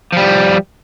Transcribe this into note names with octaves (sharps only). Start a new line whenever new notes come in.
F3 G3